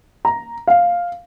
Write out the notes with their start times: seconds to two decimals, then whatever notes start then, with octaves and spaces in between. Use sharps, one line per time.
0.25 A#5
0.67 F5